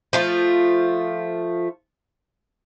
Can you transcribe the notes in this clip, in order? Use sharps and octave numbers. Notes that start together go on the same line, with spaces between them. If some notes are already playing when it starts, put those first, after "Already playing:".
F3 A3 F4